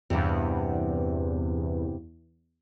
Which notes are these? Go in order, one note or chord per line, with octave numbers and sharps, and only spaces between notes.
E2 G2 C3